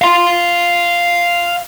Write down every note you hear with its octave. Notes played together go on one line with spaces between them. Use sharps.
F5 C6